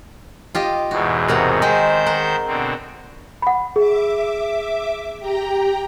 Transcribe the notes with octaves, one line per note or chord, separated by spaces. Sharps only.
F4 G4 D#5
E2 G#2 B2 F#4
C3 A#4 F#5
D#3 G#3 C4 B4 C5 G6
A#4 F#5
B2 D3 C4
F#5 B5
G#4 E5 D6
G4 G5 A#5